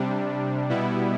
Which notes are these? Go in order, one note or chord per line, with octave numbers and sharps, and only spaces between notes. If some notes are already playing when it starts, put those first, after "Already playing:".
Already playing: C3 G3 D4
B2 G3 B3 E4